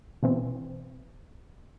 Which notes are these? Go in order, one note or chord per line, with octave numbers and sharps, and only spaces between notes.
B2 E3 C4